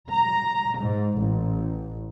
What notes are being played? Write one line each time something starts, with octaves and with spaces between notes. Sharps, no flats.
A#5
G#2
A1